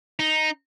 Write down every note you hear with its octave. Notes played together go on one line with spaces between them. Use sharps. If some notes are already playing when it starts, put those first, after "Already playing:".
D#4